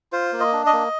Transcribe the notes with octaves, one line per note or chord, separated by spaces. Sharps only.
F4 C5
A#3
D#5
D4
D#5
A#3